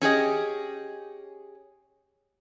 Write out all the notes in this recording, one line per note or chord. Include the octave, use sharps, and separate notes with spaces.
C#4 G4 G#4 D#5